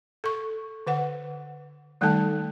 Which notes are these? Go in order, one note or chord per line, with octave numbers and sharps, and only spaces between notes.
A4 C#6
D3 B4 F#5
D#3 G3 A3 D#4 A4 A5